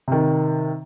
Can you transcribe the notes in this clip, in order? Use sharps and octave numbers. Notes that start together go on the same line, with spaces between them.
C3 D#3